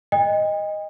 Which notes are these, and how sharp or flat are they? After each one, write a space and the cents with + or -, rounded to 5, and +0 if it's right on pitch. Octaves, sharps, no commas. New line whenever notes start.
D#5 +0 G5 +45